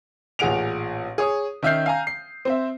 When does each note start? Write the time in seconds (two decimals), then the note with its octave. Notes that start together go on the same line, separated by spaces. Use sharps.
0.39 A1 A#2 G#4 F#5 D7 F7
1.18 G#4 C#5 D#6
1.63 D#3 C#4 E5 F6 G6 C7
1.86 F5 G#5 A#5
2.07 C7
2.45 C4 C5 E5